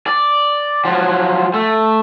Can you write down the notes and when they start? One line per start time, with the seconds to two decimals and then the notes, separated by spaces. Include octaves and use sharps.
0.07 D5
0.85 F3 F#3
1.54 A3